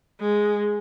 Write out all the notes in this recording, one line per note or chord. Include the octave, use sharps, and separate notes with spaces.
G#3